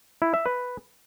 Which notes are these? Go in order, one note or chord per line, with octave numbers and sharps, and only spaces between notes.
E4
E5
B4